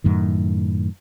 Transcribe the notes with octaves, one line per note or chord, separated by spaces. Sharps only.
F#2 A2 D#3